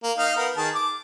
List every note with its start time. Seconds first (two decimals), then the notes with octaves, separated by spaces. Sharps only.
0.03 A#3
0.18 D#4 F5
0.37 B3 A#4
0.57 D#3 G#4 A5
0.75 D6